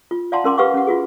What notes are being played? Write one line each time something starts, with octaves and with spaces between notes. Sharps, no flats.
F4
D5 F5 F#5 A5 A#5 C6
C#4 A#4 C6 D6
G4 B4 F5 F#5 C#6 D6
C#4 F#5
F4 F#4 G#4